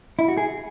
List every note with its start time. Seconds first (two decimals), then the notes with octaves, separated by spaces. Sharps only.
0.19 E4
0.28 F#4
0.37 G#4